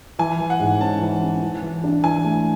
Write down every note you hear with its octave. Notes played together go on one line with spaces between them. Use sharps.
E3 G#5
E3
F#5
G#2
C#4 A5
E3
C#4
E3
E3
D4
E3 G#5
A3